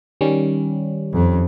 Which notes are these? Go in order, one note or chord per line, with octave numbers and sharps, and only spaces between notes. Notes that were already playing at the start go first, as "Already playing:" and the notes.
D#3 G3 C#4
F2